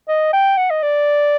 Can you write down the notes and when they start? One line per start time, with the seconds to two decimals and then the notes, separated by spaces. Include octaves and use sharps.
0.08 D#5
0.33 G5
0.58 F#5
0.70 D#5
0.83 D5